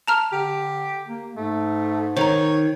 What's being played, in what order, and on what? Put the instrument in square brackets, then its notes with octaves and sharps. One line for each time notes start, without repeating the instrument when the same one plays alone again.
[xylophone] A5 A#5 F6
[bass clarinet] D3 [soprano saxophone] G4
[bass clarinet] A#3
[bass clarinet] G#2 [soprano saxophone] A3
[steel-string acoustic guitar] D#3 [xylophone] C5 A#5 [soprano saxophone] C#5